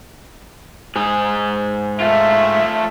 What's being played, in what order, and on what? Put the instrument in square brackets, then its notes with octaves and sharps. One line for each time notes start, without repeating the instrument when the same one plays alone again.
[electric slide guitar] G#2 G#4
[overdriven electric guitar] A3 F4 [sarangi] E5